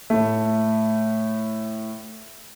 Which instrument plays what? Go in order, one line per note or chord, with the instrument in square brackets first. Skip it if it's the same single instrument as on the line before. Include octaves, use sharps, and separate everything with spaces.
[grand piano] A2 A3